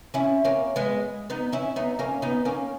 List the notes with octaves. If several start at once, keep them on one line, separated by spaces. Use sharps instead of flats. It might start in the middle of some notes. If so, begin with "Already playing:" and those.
C#4 E4
A#3 C#4
G#3 B3
B3 D#4
C#4 E4
B3 D#4
A#3 C#4
B3 D#4
A#3 C#4